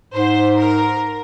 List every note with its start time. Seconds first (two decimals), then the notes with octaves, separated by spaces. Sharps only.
0.13 G#2 C5
0.57 A#4